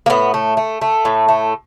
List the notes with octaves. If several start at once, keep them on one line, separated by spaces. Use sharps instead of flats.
A#3
A2 B3
A3
A3
A3
A2
A3